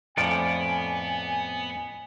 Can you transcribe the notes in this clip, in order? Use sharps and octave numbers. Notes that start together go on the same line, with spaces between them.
F2 A2 F3 B3 A4 D5 G#5